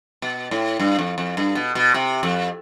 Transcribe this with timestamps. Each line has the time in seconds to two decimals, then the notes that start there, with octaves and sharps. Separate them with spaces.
0.22 B2
0.51 A2
0.80 G2
0.99 F2
1.18 F2
1.37 G2
1.55 B2
1.75 B2
1.94 C3
2.23 F2